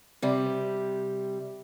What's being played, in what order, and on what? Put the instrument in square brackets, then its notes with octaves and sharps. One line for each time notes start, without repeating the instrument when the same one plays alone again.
[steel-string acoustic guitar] C3 G3